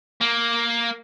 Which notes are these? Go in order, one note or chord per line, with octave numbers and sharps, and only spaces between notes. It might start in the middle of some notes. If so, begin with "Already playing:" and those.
A#3